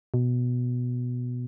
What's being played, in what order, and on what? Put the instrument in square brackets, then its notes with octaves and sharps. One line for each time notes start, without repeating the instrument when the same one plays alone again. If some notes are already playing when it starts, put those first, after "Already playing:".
[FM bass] B2